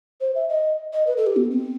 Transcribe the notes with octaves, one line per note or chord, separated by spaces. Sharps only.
C5
E5
D#5
D#5
B4
A4
G4
B3
C4